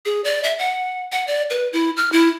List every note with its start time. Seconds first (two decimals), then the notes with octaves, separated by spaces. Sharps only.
0.05 G#4
0.24 D5
0.43 E5
0.59 F#5
1.12 F#5
1.27 D5
1.50 B4
1.73 E4
1.97 F6
2.12 E4